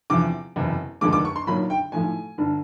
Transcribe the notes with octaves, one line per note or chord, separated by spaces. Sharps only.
E2 C3 F3 D6
F#1 E2 C3
F1 D#2 D3 F3 G#3 D6
D6
C#6
C6
B1 A#2 F#3 B5
G5
B1 A2 F3 A3 G#5
G1 D3